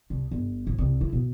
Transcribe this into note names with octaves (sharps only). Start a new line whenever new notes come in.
C2
G1
A1
C2
E4
B2